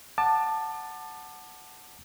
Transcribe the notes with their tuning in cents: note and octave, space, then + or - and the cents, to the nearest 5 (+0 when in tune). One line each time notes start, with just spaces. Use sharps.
F#5 +0 A5 +5 D6 +30